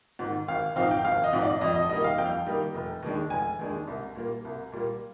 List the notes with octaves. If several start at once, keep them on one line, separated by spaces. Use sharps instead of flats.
G#2 D#3
G#1 F5
G#2 F3 C4 D#4 F5
G5
G#1 F5
D#5
G#2 F3 C4 D#4
D5
F2 D#5
D#5
D#3 G3 A#3 D#4 D#5
F5
F2 G5
D#3 G3 A#3 D#4
F1
D#2 D#3 G#3 D4
F1 G#5
D#2 D#3 G#3 D4
C2
A#2 G3 A#3
C2
A#2 G3 A#3